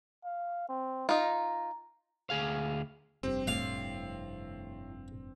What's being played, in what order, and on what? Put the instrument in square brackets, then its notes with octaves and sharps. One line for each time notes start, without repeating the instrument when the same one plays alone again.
[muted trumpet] F5
C4
[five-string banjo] D#4 F4 [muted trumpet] A#5
[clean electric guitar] D2 G#4 F5
[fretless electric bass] F1 G2 [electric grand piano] C4 [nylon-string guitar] G4 C5
[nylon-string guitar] A2 [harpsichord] F5